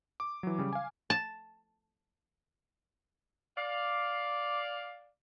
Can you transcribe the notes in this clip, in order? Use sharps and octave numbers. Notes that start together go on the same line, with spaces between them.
D6
E3 F#3
C#3 G3
F5 G#5
A5
D5 F5